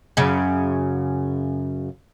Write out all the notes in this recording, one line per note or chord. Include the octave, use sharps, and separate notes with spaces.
F#2 C#3